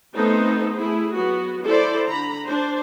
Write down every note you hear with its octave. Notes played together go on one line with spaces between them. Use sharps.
A3 B3 C4 D#4 A4 C5
A3 E4 G#4
F#3 B3 F#4
E4 A4 C5 D5
D3 A#5 B5
D4 C5